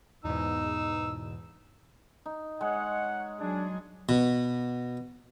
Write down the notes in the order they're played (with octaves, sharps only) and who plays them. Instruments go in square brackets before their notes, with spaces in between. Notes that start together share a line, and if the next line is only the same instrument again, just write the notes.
[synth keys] E2 G#2 B2 [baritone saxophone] D#4 [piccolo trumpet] E6
[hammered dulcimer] D#4
[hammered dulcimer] G#3 [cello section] C#5 [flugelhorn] F#5
[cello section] F#3 G#4 [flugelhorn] D4
[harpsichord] B2